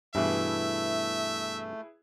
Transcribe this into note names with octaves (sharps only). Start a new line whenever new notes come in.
G2 B2 E3 A3 E4 G#4 B4 E5